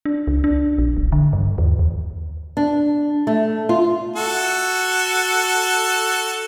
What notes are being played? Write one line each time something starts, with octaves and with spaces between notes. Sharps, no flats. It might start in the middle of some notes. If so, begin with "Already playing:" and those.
D4
C#2
D4
A#1
D1
D3
G2
D#2
E2
D4
A3
F4
F#4 A4